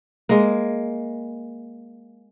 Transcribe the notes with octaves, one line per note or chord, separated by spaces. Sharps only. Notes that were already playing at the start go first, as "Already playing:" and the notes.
G#3 A#3